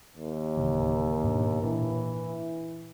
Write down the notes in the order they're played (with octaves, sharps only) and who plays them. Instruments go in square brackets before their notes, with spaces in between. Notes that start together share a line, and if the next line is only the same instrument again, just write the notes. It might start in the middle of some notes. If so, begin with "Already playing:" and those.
[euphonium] D#2
[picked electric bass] D1 C#3 E3
G#2 B2 D4
[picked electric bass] A#2 D4 [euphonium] E3